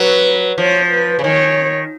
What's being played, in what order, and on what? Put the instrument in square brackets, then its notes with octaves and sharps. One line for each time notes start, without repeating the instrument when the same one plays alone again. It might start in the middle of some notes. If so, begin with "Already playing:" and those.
Already playing: [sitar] F#3 [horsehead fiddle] B4
[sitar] F3 [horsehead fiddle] C#5
[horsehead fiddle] B4
[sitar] C#3
[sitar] D#3 [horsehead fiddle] C#5